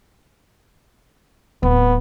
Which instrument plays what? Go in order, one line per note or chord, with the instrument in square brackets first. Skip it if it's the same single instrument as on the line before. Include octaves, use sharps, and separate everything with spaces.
[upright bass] D1 [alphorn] B3